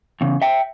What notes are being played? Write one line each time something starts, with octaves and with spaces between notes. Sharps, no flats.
E2 C#3
E5 G5